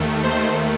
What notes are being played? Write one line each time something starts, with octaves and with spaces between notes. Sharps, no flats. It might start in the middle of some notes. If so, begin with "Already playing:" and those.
Already playing: D#2 D#3 A3
C5